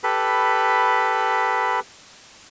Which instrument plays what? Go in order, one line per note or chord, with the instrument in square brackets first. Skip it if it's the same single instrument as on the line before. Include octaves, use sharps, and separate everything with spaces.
[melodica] G4 A4 B4 B5